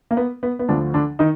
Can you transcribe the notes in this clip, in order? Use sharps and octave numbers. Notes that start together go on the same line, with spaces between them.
A#3
B3
B3
B3
D2 D3 F3 D4
D3 D4
D#3 D#4